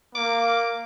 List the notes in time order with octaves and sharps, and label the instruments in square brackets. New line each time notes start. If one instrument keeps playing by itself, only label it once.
[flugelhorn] A#3 [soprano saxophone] D6